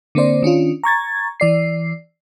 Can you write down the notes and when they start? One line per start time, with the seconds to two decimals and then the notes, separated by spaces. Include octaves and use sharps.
0.15 D3 A#3 C4 C5 D5
0.43 D#3 C#4 D4 F4
0.84 A#5 C#6 G#6 A6
1.40 E3 D5 C7